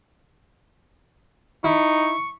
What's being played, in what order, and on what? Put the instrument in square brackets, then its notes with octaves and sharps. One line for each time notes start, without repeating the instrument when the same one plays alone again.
[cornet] D#4 [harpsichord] E4 [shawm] C#6